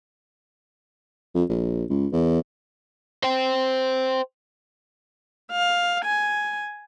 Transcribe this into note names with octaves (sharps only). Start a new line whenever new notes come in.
F2
A#1
C#2
E2
C5 G5
F5
G#5